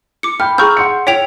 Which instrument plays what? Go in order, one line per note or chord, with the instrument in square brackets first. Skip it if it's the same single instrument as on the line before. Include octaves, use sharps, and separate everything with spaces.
[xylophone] D6 C#7
[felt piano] G5 B5 G6 [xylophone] F6
[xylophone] G#4 C#6 G6 [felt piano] A#5 E6 F6
[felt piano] F#5 C6 C#7
[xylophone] C#5 G5 F7 [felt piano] B6